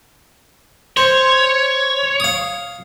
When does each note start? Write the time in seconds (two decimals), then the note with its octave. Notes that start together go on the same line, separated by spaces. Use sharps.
0.97 C5 C#5
2.20 F5 D#6